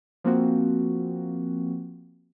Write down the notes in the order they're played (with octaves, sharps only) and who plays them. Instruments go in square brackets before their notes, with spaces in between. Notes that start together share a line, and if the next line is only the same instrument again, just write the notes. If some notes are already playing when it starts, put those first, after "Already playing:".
[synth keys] F3 A#3 C4 F#4